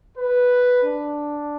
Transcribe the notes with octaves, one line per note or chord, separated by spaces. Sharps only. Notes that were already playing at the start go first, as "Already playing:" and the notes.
B4
D4